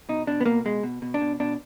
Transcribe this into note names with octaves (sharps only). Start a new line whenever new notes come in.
B2 D#4
B2 D4
B3
B2 A#3
B2 G#3
B2
B2
D4
B2
B2 D4